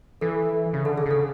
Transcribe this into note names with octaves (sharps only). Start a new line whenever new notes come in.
E3 A4
C#3
D3 A4
G#4
C#3 A4